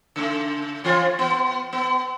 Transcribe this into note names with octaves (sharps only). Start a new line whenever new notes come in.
C#3 A3
E3 C4 F4
B3
B3